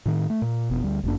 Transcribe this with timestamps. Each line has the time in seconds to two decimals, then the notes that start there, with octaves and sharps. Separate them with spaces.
0.06 A2 D#3
0.30 A3
0.42 A#2
0.70 F1 B2 B3
0.83 D2 G3
1.03 G1 F#2 A#3 D4